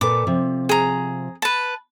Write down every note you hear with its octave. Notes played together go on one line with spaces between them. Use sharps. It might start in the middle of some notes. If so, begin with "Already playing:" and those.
A#2 A4 B4 D6
C3 F3
G#4 A#5
B4 A5